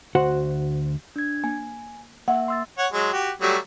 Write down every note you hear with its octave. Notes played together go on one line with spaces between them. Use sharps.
D2 F#4 C5 F#5
D4 G#6
A#3 G#5
A#3 E5 F#5
C6 E6 A6
C#5 F#5
F#3 G#3
F#4 G4
F#3 G3 A3